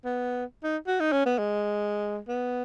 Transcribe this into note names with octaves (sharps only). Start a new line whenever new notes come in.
B3
D#4
F#4
D#4
C#4
B3
G#3
B3